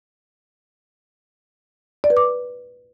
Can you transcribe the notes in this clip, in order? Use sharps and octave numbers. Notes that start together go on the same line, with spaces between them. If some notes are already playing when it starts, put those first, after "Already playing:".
D5
B4
D6